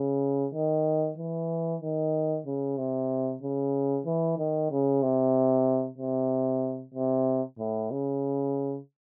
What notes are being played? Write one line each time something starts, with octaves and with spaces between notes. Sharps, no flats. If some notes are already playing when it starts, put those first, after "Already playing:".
Already playing: C#3
D#3
E3
D#3
C#3
C3
C#3
E3
D#3
C#3
C3
C3
C3
A2
C#3